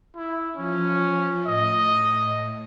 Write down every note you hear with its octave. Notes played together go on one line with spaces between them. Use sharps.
E4
F3 C#4
A2 D#5